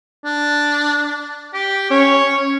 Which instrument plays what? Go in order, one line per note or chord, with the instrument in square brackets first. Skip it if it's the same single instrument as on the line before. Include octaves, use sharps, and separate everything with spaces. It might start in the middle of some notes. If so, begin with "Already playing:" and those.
[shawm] D4
G4
[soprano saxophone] C#4 [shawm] C#5